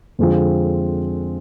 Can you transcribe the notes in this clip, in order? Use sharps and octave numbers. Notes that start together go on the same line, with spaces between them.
F2 D3 G#3 C4 F4